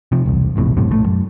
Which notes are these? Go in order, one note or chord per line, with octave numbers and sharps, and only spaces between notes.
C3 F3
E1 C2
E1 A#1 A2 C3
F#2 A2 C3
A#1 D#3 A3
F#2